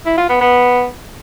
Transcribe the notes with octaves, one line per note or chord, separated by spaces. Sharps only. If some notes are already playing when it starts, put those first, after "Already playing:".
E4
F4
B3
B3